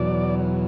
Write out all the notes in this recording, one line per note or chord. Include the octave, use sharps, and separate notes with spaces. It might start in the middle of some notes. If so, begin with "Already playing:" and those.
Already playing: E2 B2 F#3 D5